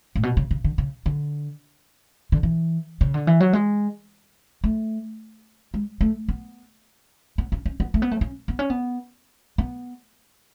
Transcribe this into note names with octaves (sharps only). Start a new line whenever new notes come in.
A2
B2
C#3
C#3
D3
C#3
D3
D3
E3
C#3
D3
E3
F#3
G#3
A3
G#3
A3
B3
B3
C#4
C#4
B3
A3
B3
A3
C#4
B3
C#4
B3
B3